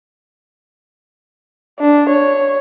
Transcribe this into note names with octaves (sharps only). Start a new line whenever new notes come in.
D4
C#5